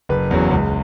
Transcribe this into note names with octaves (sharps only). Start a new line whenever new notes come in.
F#1 B4
E2 C#3 F#3
C#2